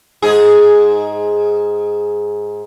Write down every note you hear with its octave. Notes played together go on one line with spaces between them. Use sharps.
G#2 G#4